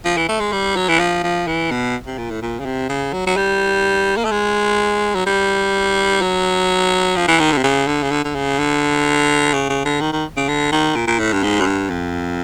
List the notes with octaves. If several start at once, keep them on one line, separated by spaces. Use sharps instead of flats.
F3
E3
A3
G#3
G3
F#3
E3
F3
F3
E3
B2
C3
A#2
A2
A#2
C#3
C3
C#3
F#3
F#3
G3
A#3
A3
G#3
F#3
G3
F#3
F3
E3
D#3
D3
C3
C#3
D3
C#3
D3
D3
C#3
D3
C#3
C#3
D3
D#3
D#3
C#3
D3
D#3
A#2
A#2
A2
G2
G#2
F#2
G2
F2